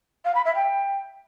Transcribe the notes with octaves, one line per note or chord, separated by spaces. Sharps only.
F5
B5
E5
G5